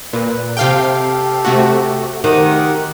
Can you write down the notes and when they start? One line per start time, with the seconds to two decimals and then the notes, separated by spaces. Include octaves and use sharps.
0.13 A#2 B4
0.57 C3 G4 A4 F5 G5
1.45 C3 A3 F#4
2.24 D#3 G4 F#5